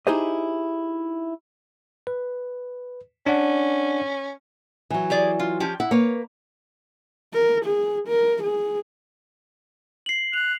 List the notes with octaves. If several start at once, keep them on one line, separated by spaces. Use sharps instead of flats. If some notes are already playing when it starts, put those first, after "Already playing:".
D#4 E4 G4 G#4 C5 D#5
B4
C#4 D4 D5 F#5
E3 F#3
G4 G#4 D5
F4
F3 C#4 G4
E4 F#5
A#3 B4 C#5
A#4
G#4
A#4
G#4
C7 F#7
F#6 F7